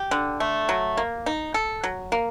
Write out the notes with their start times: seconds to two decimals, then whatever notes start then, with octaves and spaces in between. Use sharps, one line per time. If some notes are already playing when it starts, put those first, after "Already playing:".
Already playing: G4
0.11 D3
0.40 A3
0.69 F#3
0.97 A#3
1.26 D#4
1.54 A4
1.84 F#3
2.12 A#3